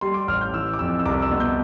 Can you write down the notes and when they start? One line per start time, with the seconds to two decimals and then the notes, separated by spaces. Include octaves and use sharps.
0.01 G3 C6
0.14 D6
0.28 A1 F6
0.41 G6
0.54 E3 E6
0.73 D6
0.79 F2 E6
0.99 E6
1.05 C2 D6
1.22 E6
1.31 B2
1.40 G6